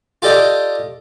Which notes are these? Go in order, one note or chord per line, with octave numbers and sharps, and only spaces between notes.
F4 G4 A4 D5 D#5 G5